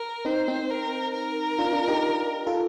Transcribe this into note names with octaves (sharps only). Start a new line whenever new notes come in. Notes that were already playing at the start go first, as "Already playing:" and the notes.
Already playing: A#4
C4 D#4 C5
C4 D#4
A#4
A#4
D4 F4
D4 F4
D#4 G4
F4 A4